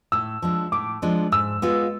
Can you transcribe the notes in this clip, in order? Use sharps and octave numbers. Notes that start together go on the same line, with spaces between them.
A2 E6
F3 G#3 D4
A2 D6
F3 G#3 D4
G#2 E6
G#3 B3 F4